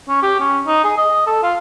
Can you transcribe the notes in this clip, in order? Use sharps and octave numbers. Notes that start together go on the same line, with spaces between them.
C#4
G4
C#4
D#4
G#4
D#5
A4
F4